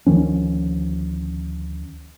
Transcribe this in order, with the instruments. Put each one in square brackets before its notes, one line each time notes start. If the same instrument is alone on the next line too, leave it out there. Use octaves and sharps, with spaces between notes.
[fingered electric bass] D2 D#3 F3 C#4